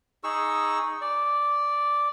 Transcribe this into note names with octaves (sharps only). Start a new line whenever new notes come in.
D#4 G#4 C#6 E6
D5